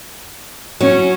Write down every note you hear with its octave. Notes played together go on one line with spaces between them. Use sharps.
F#3 C#4